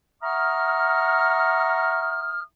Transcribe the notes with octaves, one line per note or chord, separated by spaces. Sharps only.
E5 F#5 A#5 C#6 D#6 F6